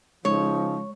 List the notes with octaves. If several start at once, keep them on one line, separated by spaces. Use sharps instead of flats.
C#3 F3 G#3 D#4 C#5